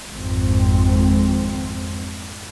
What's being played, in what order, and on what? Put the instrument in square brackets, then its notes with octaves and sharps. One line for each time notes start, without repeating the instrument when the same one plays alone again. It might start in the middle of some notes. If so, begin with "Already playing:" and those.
[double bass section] G#1 F2 G#2 C4